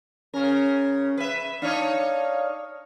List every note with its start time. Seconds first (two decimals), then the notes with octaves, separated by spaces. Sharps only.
0.34 C#3 C#4 A#4
1.17 B4 E5
1.62 D4 D#4 C#5 F5